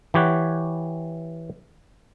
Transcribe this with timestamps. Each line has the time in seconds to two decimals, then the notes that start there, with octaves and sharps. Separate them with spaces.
0.14 E3 G4 C#5 F#5